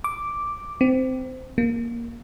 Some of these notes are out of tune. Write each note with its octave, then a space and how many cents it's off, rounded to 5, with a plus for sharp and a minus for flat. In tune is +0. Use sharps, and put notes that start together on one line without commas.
D6 -5
C4 -15
A#3 +10